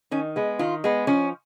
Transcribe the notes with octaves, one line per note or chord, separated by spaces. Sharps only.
D#3 C#4
G#3 B3
D#3 F4
G#3 B3
F3 C#4